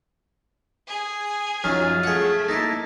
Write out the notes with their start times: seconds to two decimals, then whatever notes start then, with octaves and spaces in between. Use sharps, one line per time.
0.87 G#4 G#5
1.64 F#2 D#3 F3 F#3 F4
2.03 A3 G#4 F#5
2.48 A#3 D#4 E4 A5